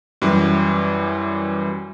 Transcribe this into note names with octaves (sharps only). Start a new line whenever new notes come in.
F#2 E3 G3